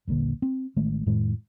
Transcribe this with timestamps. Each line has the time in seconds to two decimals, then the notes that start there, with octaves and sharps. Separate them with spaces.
0.07 D#1 A#1 A#2 D3
0.42 C4
0.76 A1 D#3 G#3 A3
1.06 F2 A2 D#3 G#3